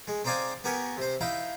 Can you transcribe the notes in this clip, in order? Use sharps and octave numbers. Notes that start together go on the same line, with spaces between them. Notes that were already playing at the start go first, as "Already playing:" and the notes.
G#3
C4 D#4 C5 D5 F5 G#5
B3 G4 A#4 G#5 C#6
C3 C5
D#4 E4 F5 G5